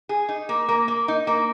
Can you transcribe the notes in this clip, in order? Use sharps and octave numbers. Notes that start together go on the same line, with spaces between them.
G#4
D#4
A#3
A#3
A#3
D#4
A#3